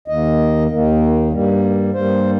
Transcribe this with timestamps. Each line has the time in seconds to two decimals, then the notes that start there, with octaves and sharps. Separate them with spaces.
0.08 D#2 D#3 A#3 D#5
0.70 D#2 D#3 A#3
1.32 G2 G3 A#3
1.94 G2 G3 A#3 C5